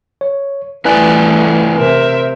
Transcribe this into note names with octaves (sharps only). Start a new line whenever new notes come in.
C#5
G2 E3 A3 E4 B4 D5 G#5 F#6
C3 A#4 C5 E5